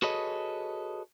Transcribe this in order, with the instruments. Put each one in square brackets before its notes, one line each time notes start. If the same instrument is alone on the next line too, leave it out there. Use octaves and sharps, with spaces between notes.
[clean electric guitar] F#4 G#4 A4 B4 C#5 D#5